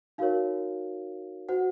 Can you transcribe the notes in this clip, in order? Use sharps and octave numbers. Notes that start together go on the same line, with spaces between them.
D#4 F#4 A#4 C#5 F5
F#4 C5 F#5